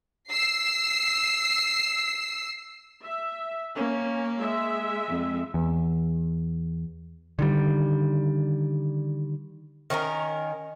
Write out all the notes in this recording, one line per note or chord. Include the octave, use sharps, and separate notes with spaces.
E6 C7
E5
A#3 C#4
G#3 E5
F2
E2
D3 D#3 G3
D#3 C#4 D#4 A#4